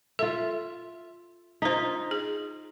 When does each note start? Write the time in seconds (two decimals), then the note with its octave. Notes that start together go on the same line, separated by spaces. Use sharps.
0.19 F4 A4 E5
1.62 D4 D#4 F4 C5
2.11 G#4